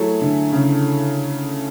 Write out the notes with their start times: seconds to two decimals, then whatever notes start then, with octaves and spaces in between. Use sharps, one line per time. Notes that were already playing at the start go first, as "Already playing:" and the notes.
Already playing: F#3 A3 E4 G#4 A4
0.21 D3
0.52 C#3